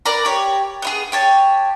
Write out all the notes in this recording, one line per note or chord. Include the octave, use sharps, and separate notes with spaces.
A#4 B4 D5 A#5
G4 C#5
B3 E4 G#4
G4 C#5 A5